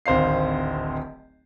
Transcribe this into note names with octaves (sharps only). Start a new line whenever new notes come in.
D1 G#1 C5 F5 C7